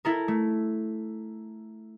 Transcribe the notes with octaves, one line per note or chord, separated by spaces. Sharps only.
E4 A4 A#4
A3